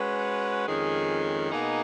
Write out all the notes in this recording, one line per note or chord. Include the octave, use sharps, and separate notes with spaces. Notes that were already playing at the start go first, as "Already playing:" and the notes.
Already playing: G#3 C#4 F#4 B4
F2 D#3 G#3 C#4 G#4
B2 A#3 D#4 G#4 D#5